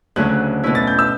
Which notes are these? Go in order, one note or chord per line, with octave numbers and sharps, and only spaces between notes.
D2 C#3 F#3 A3 C#4 F#6
B2 A3 C#4 E4
A6
G6
E6